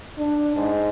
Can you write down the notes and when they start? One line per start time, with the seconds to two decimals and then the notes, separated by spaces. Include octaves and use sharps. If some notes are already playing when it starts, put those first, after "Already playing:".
0.19 D4
0.56 G#2